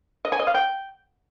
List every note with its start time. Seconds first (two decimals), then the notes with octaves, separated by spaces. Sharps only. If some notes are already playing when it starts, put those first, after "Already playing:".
0.25 D#5
0.32 G#5
0.40 D#5
0.47 F5
0.54 G5